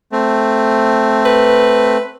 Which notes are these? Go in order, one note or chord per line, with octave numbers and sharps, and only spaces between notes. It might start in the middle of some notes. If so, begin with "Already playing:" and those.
A3 C4
B4